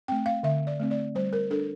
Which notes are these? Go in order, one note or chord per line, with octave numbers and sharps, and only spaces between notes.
A3 C4 G5
F5
D3 E5
D5
A3 C4
D5
G3 C5
A#4
D4 A4